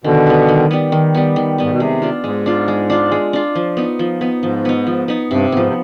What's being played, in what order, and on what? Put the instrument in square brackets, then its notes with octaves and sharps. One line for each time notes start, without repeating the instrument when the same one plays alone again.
[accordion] B2 D3 [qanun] D#3
[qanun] G3 B3
D#3
G3 B3
D#3
G3 B3
D#3
[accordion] G#2 [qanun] G3 B3
[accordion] B2
[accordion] C3 [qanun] G#3
[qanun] D4 F4
[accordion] G#2 [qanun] G#3
[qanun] D4 F4
G#3
D4 F4
G#3
D4 F4
F3
B3 D#4
F3
B3 D#4
[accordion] G#2 [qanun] F3
[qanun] B3 D#4
F3
B3 D#4
[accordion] G2 [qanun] C3
[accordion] G#2 [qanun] F3 B3
[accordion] C3